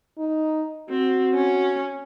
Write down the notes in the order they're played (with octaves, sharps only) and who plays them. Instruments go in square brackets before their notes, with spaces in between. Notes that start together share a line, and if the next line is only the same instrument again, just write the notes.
[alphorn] D#4
[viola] C4 [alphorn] F#4
[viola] C#4